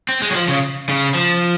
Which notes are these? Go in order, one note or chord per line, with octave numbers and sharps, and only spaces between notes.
C4
G#3
F#3
F3
C#3
C#3
F3